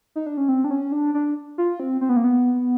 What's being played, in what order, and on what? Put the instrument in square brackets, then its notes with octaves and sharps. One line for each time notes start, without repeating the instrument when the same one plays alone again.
[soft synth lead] D#4
D4
C#4
C4
D4
C#4
D4
D4
F4
C4
C4
B3
A#3
B3